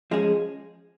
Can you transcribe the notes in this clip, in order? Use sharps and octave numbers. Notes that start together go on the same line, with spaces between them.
F3 G#3 C#4 G#4